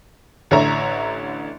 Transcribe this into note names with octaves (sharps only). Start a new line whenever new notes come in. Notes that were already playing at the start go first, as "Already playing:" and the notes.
A1 D3 C#5 E5 A#5